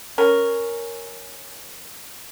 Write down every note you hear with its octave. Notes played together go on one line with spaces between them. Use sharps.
C#4 A#4